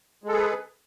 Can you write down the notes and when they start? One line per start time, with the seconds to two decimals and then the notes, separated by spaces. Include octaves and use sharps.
0.24 G#3
0.28 A4
0.32 G#4
0.37 B4